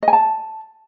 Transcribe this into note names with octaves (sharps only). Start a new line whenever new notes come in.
D#5
G#5
A5